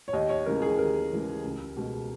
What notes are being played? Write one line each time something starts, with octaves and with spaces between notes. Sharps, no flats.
C#5
D#2 D#5
C#5
C#3 E3 G#3 A#4
G#4
D#2 A#4
C#3 E3 G#3
C#2
B2 G#3